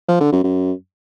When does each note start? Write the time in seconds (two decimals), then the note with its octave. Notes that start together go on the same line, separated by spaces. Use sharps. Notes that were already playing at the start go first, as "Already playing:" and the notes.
0.09 F3
0.20 D3
0.32 F#2
0.44 F#2